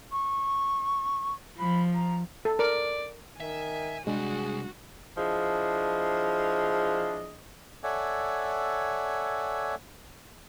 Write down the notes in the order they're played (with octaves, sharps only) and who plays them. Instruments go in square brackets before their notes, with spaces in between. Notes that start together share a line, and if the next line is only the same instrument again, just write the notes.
[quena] C#6
[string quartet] F3 [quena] B5
[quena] A#5
[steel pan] A4
[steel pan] A#4 [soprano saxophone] D5
[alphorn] D#3 [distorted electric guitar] E5 [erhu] G#5
[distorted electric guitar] C3 G3 [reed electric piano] G#3 D4 [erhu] F#4 [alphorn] G#4
[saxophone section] F3 D4 E4 G#4 D#5
[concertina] A4 C#5 D5 E5 F#5 G#5